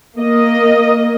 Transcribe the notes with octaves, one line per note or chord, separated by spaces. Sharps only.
A#3 D#5